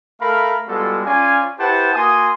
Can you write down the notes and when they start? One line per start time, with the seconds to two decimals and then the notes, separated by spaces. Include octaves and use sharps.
0.21 A3 A#4 F5 B5
0.68 G3 G#3 B3 F4 F#4 A4
1.05 C#4 F4 D5 F5 G#5
1.59 E4 G4 B4 C5 F#5 A5
1.94 A#3 F#4 G#5 C6 D#6